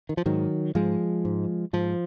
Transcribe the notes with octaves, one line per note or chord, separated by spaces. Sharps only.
D#3
F3
G#2 D#3 F#3
G#2 F3 G#3
G#2
G#2 F3